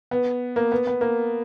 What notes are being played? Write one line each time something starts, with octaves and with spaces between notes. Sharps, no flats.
B3
A#3
B3
B3
A#3